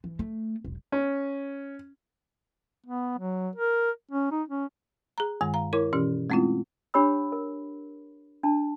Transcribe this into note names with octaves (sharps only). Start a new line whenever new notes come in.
E3
A3
E1 B1
C#4
B3
F#3
A#4
C#4
D#4
C#4
G#4 A#5
G2 D#3 G#3 G#5
F5 A#5
E4 A#4 C#5 C6 D6
B2 E3 C#4 G4
G#3 A3 C4 C#4 E4 F4
D4 G4 C#5 B5 E6
A#4
D4 A5